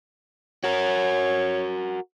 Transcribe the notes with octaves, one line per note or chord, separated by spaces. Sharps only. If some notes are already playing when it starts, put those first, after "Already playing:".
F#4 A#4 C#5